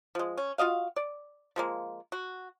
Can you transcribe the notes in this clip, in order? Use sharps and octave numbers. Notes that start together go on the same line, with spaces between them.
F3 G#3
C#4
F4 F#4 D#5 F5
D5
F3 G#3 A#3
F#4